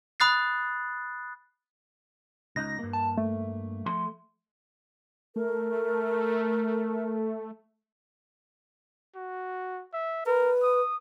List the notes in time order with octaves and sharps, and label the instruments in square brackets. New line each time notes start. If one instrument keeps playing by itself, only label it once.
[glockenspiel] B5 D#6 F#6 A6 C7
[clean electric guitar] C#2 D#4 [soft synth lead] A#6
[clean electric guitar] G2 A#3
[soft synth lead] A5
A3
[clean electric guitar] F3 A4 C6
[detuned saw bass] A3 [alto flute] A#4
[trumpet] F#4
E5
[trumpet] A#4 [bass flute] B4
[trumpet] D#6